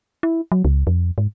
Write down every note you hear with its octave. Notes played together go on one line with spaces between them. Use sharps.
E4
F#3
C#2
F2
G#2